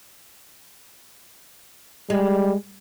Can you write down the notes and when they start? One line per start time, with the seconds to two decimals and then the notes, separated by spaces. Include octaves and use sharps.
2.10 G3 G#3